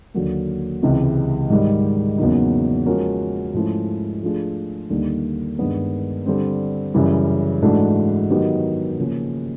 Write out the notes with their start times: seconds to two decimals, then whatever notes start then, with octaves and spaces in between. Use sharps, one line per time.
0.14 D#2 D3 F#3 A#3
0.82 C#2 C3 E3 G#3
1.50 G#2 D#3 G3
2.18 E2 C#3 F#3 A#3 D#4
2.86 F3 G#3 C#4 F#4 A#4
3.54 G#2 F3 A3 C#4 E4
4.23 F3 A3 D4 F4 G#4
4.90 D#2 D3 G3 A#3 D#4
5.58 G2 D#3 G#3 B3 D4
6.26 D3 G3 C4
6.94 F#2 C#3 E3 G3
7.62 G#2 E3 A3 D4 F#4
8.30 D#3 F#3 B3 D#4 G4
8.98 C#3 F3 A#3 C#4